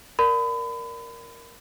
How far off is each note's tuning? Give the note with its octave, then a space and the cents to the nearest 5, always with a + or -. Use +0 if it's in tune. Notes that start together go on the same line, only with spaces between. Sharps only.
A#4 +0 D5 +0 B5 +30